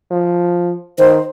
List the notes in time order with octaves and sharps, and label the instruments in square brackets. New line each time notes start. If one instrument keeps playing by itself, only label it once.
[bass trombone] F3
[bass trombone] D#3 [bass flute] C5